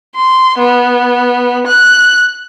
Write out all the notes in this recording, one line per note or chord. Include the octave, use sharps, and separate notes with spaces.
C6
B3
F#6